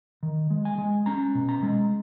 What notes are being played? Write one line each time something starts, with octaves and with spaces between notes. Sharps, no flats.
D#3
G#3
G#5
G#3
C#4 A#5
B2
A#5
G#3